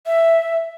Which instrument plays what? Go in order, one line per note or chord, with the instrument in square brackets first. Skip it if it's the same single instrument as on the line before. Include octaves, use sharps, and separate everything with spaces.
[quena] E5